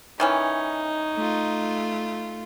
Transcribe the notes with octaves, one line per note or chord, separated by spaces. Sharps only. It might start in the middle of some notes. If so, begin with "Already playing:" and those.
D#3 E3 C#4 D#4
A3 F4